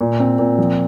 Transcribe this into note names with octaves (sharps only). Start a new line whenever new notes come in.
A#2
C4
A#2
F3